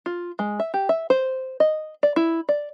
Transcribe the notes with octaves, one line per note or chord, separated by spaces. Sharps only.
F4
G#3
E5
G4
E5
C5
D#5
D5
E4
D5